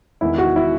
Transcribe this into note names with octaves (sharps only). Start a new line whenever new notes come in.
E1 E2 D#3 E4
F#4
E4